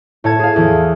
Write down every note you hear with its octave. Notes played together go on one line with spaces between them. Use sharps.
A2 C#5 A5 G#6 E7
G#4 F5
E2 E3